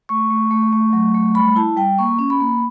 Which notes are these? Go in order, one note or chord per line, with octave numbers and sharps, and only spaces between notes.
A3 C#6
A3
A3
A3
F#3
A3
G3 B5
E4 A5
G3 G5
A#3 C#6
C#4
B5
A#3